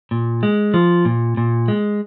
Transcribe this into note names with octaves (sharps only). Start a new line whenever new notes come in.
A#2
G#3
F3
A#2
A#2
G#3